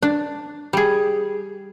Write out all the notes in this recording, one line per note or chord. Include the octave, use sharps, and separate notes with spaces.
D4
G3 G#4